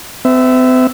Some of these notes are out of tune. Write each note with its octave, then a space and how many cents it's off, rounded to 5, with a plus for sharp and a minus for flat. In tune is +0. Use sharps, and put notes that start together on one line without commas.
C4 -45 E5 +0